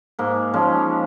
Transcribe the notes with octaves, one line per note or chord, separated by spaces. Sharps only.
G#2 A#3
F3 G#3 C#4